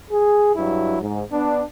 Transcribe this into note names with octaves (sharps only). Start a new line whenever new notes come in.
G#4
G2 F#3 E4
G#2
B3 D4